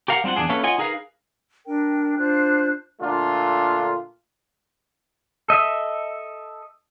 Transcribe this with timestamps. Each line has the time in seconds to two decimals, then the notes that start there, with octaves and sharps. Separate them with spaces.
0.08 G4 A#4 F5 F#5
0.24 G3 C4 D4 F4 F#5
0.36 E2 A#2 D4 G#4
0.49 A3 A#3 C#4 E4 A4 B4
0.63 F4 C#5 D#5 F#5 G#5
0.78 D#4 G#4 A#4 B4 F5
1.66 D4 A#4 G5
2.18 D4 F4 C5 F#6
3.00 A#2 D3 A3 D4 F4
5.48 A4 D#5 E5